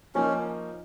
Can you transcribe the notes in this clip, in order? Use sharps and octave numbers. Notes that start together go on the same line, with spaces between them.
F3 A#3 C#4 D#4